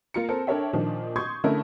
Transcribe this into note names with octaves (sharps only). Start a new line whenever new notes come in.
A#3 F4 A#5 C#7
C4 A4 A#4 C5
D4 A4 A#4 C#5 E5 G5
A#2 D#3 F3 A#3 D4
C6 C#6 D#6 G6 G#6
D3 A3 C#4 E4 A4 A#4